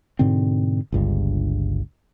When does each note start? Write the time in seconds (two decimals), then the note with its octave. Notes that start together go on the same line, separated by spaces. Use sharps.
0.19 G#2 B2 D3 C4
0.92 G1 C#2 G2